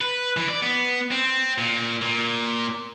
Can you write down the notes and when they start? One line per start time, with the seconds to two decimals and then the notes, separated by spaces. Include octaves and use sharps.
0.01 B4
0.37 E3
0.49 D5
0.63 B3
1.11 C4
1.58 A#2
2.02 A#2